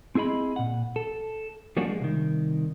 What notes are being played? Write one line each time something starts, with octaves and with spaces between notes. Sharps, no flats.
C4 E4 G#4 D#5 B5
A#2 F#5
A4
F3 G3 A#3 C#4 D4 F#4
G#3
C2 D#3